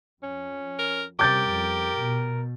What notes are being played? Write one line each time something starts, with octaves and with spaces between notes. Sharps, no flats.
F2 C#4
A#4
C3 G3 C#4 G4 A#4 D6 G6 A6
F2
B2